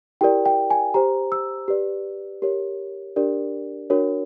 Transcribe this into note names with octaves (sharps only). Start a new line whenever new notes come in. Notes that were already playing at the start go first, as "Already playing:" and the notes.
E4 G4 A#4 D5 G5
G5
G#5
G4 C5 A#5
E6
G4 B4 D5
G4 A#4 C#5
D4 G4 A#4 D5
D4 F#4 A#4 C#5